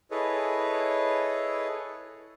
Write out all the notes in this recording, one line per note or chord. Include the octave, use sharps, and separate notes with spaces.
E4 G#4 A4 B4 C#5 D#5